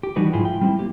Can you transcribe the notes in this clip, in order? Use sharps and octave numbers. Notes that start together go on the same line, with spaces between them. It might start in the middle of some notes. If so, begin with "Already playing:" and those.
G4
E3 G3 D4 D#4 F#4 B4
G#2 F3 E4 F4 G#4
G5
G3 C4 E4
A#3 G4